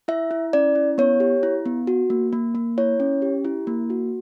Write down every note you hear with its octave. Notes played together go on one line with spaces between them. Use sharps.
E4 E5
E4
C#4 D5
E4
B3 C#5
G4
E4
B3
F#4
A#3
A#3
A#3
E4 C#5
C#4
G4
E4
A#3
F#4